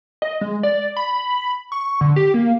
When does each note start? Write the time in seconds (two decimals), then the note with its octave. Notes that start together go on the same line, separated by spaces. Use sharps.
0.22 D#5
0.41 G#3
0.63 D5
0.97 B5
1.72 C#6
2.01 D3
2.16 G4
2.34 A#3